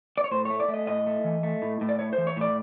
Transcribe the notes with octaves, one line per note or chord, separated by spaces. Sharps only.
D5
C#5
A2 C5
A3 C#5
D5
A3
D#5
A2 D#5
A3
E3
A3
A2
A2
D5
A3 C#5
C5
E3
C#5
A2 D5